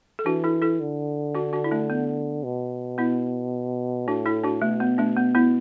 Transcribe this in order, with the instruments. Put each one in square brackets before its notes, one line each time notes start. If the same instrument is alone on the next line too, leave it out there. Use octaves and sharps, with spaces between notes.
[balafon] A4
[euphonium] E3 [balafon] D4 F#4
[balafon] E4 A4
E4 A4
[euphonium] D3
[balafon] D4 F#4
D4 F#4
E4
A3 D4
B3
[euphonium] B2
[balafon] B3 E4
[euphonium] A2 [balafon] D4 F#4
[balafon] E4 A4
D4 F#4
[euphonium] B2 [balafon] A3
[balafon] B3
A3 D4
B3
B3 E4